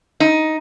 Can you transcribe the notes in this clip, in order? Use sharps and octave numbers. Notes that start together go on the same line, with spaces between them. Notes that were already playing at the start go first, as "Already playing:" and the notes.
D#4